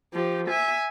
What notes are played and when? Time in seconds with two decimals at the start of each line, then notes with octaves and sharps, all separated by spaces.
0.13 F3 G4
0.48 E5 G#5